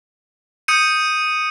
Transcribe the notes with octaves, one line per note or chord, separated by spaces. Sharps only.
D#6 G6 C#7 D#7